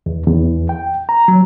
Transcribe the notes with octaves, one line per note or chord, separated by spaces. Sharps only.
E2
E2
G5
A#5
F#3